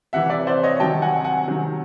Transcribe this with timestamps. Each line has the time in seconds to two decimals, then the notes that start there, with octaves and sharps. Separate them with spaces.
0.13 C3 E3 E5 F#5
0.30 D5 E5
0.47 C5 D5
0.63 C#5 D#5
0.80 C3 D#3 F#3 G5 A5
1.02 F#5 G#5
1.24 F#5 G#5
1.47 C3 D#3 F#3